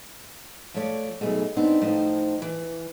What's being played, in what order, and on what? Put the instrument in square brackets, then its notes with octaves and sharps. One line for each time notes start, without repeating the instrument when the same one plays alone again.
[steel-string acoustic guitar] F3 A3 C#5 D5
F#2 B2 A3 D#4 G#4
B3 C4 D4 D#4
A2 F3 D#4 C5
E3